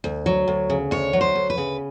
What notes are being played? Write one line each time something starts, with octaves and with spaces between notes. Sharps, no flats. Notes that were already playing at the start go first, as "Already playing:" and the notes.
D2
F#3
D2
C#3
D2 C#5
F#3
C5
D2
B4
C#3